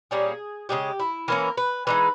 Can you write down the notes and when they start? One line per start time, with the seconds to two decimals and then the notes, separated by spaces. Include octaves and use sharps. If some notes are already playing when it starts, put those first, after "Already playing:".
0.11 A#2 G3 A#3 C#4 G#4
0.69 C#3 E3 G#3 G4
1.00 E4
1.28 E3 A#3 C#4 A#4
1.57 B4
1.87 E3 G#3 D#4 B4